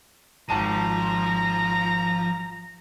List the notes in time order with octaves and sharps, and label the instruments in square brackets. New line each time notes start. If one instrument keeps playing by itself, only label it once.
[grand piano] G#1 A5 D#7 [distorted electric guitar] F3 [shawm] A#5